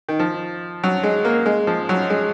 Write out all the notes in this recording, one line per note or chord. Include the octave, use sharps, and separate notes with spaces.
D#3
F3
F#3
G#3
A#3
G#3
F3
F#3
G#3